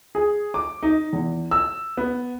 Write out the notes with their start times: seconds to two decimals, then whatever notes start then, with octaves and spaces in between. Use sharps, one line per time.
0.15 G#4
0.54 D6
0.83 D#4
1.13 E2
1.51 E6
1.97 B3